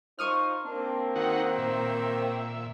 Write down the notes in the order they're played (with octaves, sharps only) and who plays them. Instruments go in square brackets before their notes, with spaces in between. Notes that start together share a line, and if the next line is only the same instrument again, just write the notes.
[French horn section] D#4 F4 C5 [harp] C#6 D#6 F6
[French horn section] A#3 C4 [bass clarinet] D4
[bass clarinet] D#3 [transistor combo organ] D#4 F#4 F#5
[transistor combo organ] A#2 E5